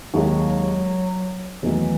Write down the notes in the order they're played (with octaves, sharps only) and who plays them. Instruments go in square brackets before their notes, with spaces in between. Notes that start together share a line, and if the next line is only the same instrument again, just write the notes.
[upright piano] D#2 D#3 G#3 [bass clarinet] F#3
[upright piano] E2 D#3 F#3 A3 D#4 [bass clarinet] E3